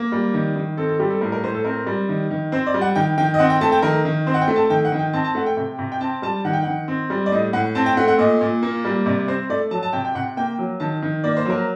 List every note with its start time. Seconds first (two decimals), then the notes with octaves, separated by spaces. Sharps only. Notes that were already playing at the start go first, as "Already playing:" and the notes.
Already playing: A#3
0.12 G3
0.34 D#3
0.56 D#3
0.77 C4 A4
0.89 A4
0.99 G3 G4
1.10 A4
1.21 A2 A#4
1.32 A#4
1.43 A2 C5
1.54 A4
1.65 C4 A#4
1.86 G3
2.09 D#3
2.30 D#3
2.52 C4 C5
2.67 D5
2.74 G3
2.81 F#5
2.95 D#3 G5
3.17 D#3 G5
3.34 D#5
3.39 C4 F#5
3.50 G5
3.61 A3 A5
3.72 G5
3.82 D#3 A#4
4.05 D#3
4.27 C4 C5
4.34 F#5
4.41 G5
4.48 A3
4.56 A5
4.70 D#3 G5
4.85 F#5
4.92 D#3
4.99 G5
5.13 C4 A5
5.24 A5
5.35 A3 F#5
5.46 G5
5.57 C3 G5
5.79 C3
5.92 G5
6.01 C4 A5
6.22 G3 A5
6.45 D#3 F#5
6.53 G5
6.63 D#3 F#5
6.88 C4
7.10 G3
7.26 D5
7.32 A2 D#5
7.53 A2 F#5
7.75 C4 A5
7.86 G5
7.97 A3 F#5
8.08 F#5
8.18 A#2 D#5
8.41 A#2
8.63 A#3
8.85 G3
9.06 C3 D5
9.28 C4 C5
9.50 A3 D5
9.71 F#3 A5
9.83 A5
9.93 C3 G5
10.05 G5
10.15 C3 F#5
10.37 A#3 G5
10.58 F#3
10.80 D#3 A5
11.02 D#3
11.24 A#3 D5
11.37 C5
11.45 F#3 A#4